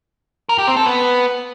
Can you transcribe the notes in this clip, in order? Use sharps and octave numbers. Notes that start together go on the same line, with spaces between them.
A#4
G4
C4
A4
B3